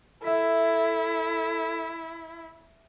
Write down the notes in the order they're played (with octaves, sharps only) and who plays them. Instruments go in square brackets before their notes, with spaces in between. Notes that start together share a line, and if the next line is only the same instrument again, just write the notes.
[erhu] E4 [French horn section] A4 [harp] E5 B6